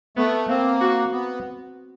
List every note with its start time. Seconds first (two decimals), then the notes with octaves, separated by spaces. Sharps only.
0.17 A3 B3
0.48 A#3 C4
0.81 F#4
1.12 B3